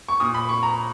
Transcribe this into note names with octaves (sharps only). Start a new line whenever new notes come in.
C#6
A#2 D#6
B5
C#6
A#5